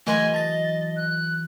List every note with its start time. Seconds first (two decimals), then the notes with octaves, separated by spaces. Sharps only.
0.07 E3 F#3 A3 A#4 D#5 G#5 C6
0.34 A5 A6 A#6
0.97 F#6